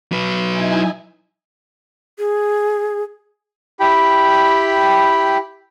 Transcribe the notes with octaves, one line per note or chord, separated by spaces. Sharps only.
F#3 B4
D#4 E4 G#5
G#4
E4 G4 G5 B5